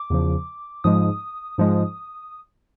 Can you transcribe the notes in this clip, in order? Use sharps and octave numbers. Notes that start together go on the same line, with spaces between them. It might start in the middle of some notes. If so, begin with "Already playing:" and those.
Already playing: D6
E2 C#3 F3
G#2 F3 G#3 D#6
G#2 F3 G#3